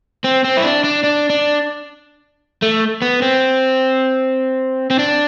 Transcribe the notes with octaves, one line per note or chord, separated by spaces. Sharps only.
C4
C4
E4
D4
D4
D4
D4
A3
B3
C4
C4
D4